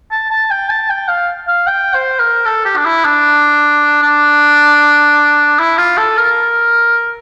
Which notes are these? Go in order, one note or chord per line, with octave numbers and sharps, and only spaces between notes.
A5
A5
G5
A5
G5
F5
F5
G5
C5
A#4
A4
G4
D4
E4
D4
D4
E4
F4
A4
A#4